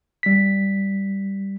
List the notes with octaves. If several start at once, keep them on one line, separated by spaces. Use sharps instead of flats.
G3 B6